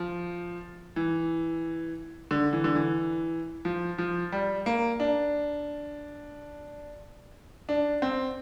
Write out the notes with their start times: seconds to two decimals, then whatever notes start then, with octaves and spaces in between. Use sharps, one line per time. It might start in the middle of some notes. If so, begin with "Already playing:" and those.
Already playing: F3
0.96 E3
2.31 D3
2.53 E3
2.64 D3
2.75 E3
3.65 F3
3.98 F3
4.32 G3
4.66 A#3
5.00 D4
7.69 D4
8.02 C4